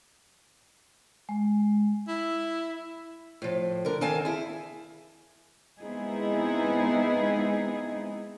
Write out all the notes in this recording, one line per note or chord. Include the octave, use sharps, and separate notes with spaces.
G#3
E4
A2 F3
D3 A#4
D#3 C4 F5 G#5 A5
E4 G#4
G#3 B3 C4 D#4 E4 G#4